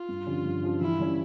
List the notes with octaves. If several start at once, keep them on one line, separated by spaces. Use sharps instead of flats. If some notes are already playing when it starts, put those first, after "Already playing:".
Already playing: F4
G2
D3 F3 C#4 G4
G2
D3 F3 C#4 G4
E3 E4
G3 C#4